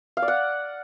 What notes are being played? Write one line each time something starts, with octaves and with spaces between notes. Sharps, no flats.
F5
D5
F#5